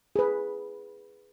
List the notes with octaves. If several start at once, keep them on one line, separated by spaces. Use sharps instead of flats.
G#4 B4